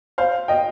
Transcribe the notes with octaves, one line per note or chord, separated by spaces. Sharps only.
C5 F5
D#5 G5